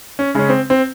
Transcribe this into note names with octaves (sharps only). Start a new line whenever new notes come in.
C#4
C#3 G#3 C#4
C4
C4